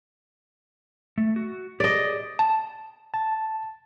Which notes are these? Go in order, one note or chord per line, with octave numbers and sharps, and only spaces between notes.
A3
F#4
G4 G#4 D5 D#5
A5
A5